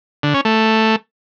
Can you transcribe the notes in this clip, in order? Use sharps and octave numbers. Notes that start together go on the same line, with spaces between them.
D3
C#4
A3